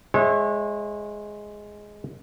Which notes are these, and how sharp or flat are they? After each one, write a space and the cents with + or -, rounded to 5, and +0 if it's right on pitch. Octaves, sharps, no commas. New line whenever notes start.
G#3 +0 C#5 -35 E5 +0